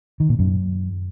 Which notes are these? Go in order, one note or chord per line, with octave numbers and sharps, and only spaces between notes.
D#3
A#2
F#2